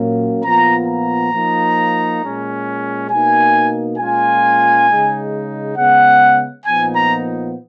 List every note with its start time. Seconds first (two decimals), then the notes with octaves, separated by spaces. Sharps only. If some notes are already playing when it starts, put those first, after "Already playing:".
Already playing: A#2 F#3 A#3 C#4
0.43 A#2 F3 B3 F4 A#5
0.88 A#5
1.32 F3 A#3 D#4
2.21 A#2 G#3 C#4
3.09 B2 A#3 D#4 G#5
3.98 A#2 G#3 C#4 F4 G#5
4.87 C#3 G#3 D#4
5.76 C#3 G#3 B3 F#5
6.65 A#2 F3 B3 D#4 G#5
6.95 A#5